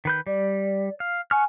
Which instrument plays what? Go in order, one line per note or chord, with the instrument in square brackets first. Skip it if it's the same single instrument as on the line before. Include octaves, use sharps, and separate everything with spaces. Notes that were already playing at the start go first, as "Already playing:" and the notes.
[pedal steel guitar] D#3 B4 G6
[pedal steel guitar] G3 [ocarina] D5
[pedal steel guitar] F5
[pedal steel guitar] F#5 C#6 F6 [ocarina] G#5